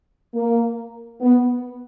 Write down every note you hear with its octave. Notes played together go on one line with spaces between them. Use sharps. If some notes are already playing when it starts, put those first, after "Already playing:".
A#3
B3